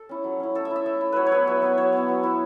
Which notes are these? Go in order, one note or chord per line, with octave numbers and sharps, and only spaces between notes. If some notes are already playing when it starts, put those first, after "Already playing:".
Already playing: A4
C#4 E4
F#3
C#4 E4
A3 A4
E5
E4
E5
A3
E4
F#3 B4 C#5
C#5
B3 E4 B4
F#3 E5
B3 E4
F#3 C#5
B3 E4
F#3
B3 E4